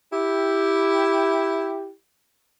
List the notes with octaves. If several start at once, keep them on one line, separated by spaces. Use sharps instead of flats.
E4 G4